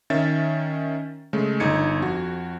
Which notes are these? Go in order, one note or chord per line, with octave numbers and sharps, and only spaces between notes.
D#3 C#4 E5 A6
C#3 G#3 A3
G1 D#4 G#6 C#7
F2 F#4